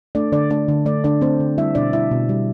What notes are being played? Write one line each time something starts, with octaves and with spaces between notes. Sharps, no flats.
A3 D4 D5
D3 D4 D5
A3 D4 D5
D3
A3 D4 D5
D3 D4 D5
A3 C4 C5
D3
G3 E4 E5
B2 D4 D5
G3 E4 E5
B2
G3